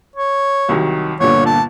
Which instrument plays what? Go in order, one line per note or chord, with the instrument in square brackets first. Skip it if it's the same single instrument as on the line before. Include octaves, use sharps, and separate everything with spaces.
[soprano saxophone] C#5
[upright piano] C2 D#3 F#3
[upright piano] G1 A#2 D3 [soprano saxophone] C#5
[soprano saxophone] A5